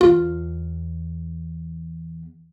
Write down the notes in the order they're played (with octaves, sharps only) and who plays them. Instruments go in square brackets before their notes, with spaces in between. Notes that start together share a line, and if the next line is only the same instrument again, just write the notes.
[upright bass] E2 [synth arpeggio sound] F4